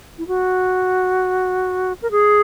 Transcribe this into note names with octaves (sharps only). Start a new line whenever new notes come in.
E4
F#4
A#4
G#4